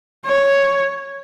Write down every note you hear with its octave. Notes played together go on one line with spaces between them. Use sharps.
C#5